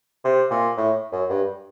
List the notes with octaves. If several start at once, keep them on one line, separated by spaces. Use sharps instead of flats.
C3
A#2
A2
F#2
G2